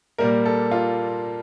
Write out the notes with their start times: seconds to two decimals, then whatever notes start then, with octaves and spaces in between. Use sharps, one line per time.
0.18 A#2 G3 A#3 A#4
0.46 A4
0.71 F4